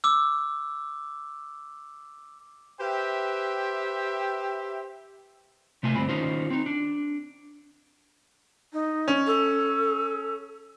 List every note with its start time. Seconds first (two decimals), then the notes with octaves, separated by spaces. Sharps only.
0.04 D6 E6
2.80 G4 B4 C5 E5 G5
5.83 C3 A3 F4 G#5
5.96 D2 G2 C4 B5
6.09 D#3 C#4 D#4 F4 C5
6.50 C4 D#4
6.66 D4
8.73 D#4
9.08 C#4
9.27 A4